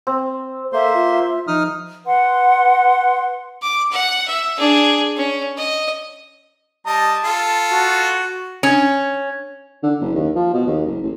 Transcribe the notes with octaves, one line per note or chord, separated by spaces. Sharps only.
C4
A#3 A4 C5 E5 C6
F4
F3 D#4 D#6 F6
B4 F#5 C6
D6
F#5
E5
D4 G#4
C#4
D#5
G3 D#5 A5
F4 A4
F#4
C#4
D3
F#1
D#2
F3
B2
D#2
F#1
A1